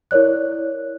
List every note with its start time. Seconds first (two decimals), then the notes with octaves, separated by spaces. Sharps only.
0.11 E4 A#4 C#5 D5 F#6